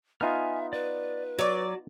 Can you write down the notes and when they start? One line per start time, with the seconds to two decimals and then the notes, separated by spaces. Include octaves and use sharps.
0.21 B3 D#4 F4 E5 G#5 F6
0.73 B4 D5
1.39 F#3 F#4 D5